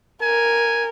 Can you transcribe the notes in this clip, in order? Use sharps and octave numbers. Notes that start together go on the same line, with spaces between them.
A#4 G#5